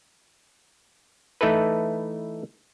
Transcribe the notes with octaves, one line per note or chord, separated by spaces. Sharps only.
E3 A3 D#4 E4 A4 B4